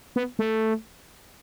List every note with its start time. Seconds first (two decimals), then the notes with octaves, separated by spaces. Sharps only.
0.16 B3
0.39 A3